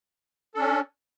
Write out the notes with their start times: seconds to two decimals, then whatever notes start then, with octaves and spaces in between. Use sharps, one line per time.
0.55 A4
0.57 D4
0.60 C#4